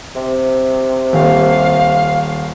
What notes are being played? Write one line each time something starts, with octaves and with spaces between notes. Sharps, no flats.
C3
D#1 F5